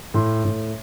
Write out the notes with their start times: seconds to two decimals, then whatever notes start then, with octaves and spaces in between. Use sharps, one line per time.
0.14 A2 C6
0.44 A2